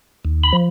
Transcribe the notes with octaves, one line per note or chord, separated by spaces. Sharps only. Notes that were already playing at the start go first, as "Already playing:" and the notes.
D#2
B5
F3